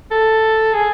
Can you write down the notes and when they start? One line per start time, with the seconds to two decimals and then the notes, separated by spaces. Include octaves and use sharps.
0.11 A4
0.73 G#4